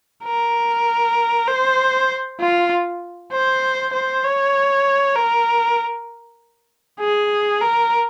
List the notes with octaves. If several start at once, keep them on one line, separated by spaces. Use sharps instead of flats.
A#4
C5
F4
C5
C5
C#5
A#4
G#4
A#4